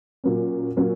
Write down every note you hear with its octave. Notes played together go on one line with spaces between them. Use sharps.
A#2 F#3 A#3 C#4
A#2 F#3 A#3 C#4